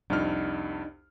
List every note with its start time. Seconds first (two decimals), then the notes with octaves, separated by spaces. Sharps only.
0.10 C2 F2 D4 D#4 F6